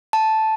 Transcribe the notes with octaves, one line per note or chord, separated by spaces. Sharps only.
A5